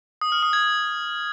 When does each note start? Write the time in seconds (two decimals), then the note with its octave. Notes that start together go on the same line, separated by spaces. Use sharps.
0.21 D#6
0.32 F6
0.43 D#6
0.53 G#6